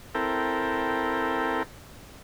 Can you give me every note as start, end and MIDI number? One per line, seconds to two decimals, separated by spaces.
0.15 1.63 60
0.15 1.63 64
0.15 1.63 69
0.15 1.63 70
0.15 1.63 79